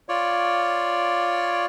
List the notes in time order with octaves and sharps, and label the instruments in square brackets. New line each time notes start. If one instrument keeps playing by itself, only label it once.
[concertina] F4 C#5 D5